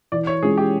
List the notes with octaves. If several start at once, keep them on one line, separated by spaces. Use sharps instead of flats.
E3 D5
C#5
G#3 C#4 F4 G#4
G4